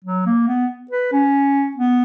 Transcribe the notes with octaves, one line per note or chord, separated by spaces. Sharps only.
F#3
A#3
B3
B4
C#4
B3